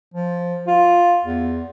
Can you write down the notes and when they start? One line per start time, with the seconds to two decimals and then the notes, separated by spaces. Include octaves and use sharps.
0.14 F3
0.68 F4
1.24 E2